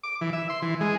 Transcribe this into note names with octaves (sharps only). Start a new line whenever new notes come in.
D6
E3
E5
C6
E3
G#3